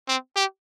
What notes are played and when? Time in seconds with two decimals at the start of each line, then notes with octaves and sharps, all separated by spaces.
0.08 C4
0.36 G4